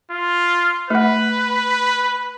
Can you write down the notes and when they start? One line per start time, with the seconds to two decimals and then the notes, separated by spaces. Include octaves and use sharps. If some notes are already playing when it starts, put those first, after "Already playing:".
0.11 F4
0.90 A3 B4 F#5